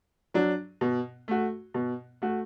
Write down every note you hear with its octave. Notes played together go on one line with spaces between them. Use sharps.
F#3 D4
B2
A3 F#4
B2
A3 F#4